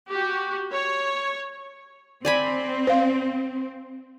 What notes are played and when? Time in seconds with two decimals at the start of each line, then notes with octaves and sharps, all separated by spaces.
0.10 F#4 G4
0.71 C#5
2.25 C4 D5 G#5 B5
2.87 C5 F5